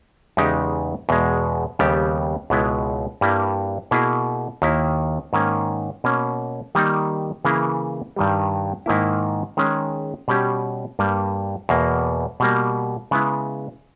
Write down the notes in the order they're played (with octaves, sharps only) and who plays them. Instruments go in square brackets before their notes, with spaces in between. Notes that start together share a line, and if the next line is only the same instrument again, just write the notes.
[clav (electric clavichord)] E2 C#3 G#3 D#4 G4
E2 B2 G#3
D#2 C#3 G3 B3 G4
C#2 B2 G#3 B3 E4
G2 G3 A#3 E4
B2 A#3 E4 G#4
D#2 D#3 A#3 E4
G#2 D#3 A#3 C#4
B2 A#3 C#4
D#3 G3 A#3 D#4
C#3 E3 A#3 E4 G#4
G2 D#3 G3
G#2 D#3 A#3 E4
D#3 G#3 C#4 G#4
B2 G3 C#4 G4
G2 G3 A#3
E2 B2 A#3
B2 G3 A#3
C#3 G#3 B3 E4